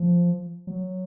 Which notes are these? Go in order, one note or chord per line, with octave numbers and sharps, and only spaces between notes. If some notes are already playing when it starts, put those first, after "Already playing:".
Already playing: F3
F#3